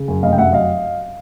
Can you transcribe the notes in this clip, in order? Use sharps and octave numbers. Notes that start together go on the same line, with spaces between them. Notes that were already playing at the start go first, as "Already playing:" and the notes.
Already playing: C#3
F#2
F1 D#5 F5
G5
F#3 E5 F#5
D#5 F5